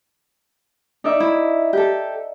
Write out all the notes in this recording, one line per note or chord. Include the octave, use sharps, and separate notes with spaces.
D#4 D5 E5
E4
G4 A4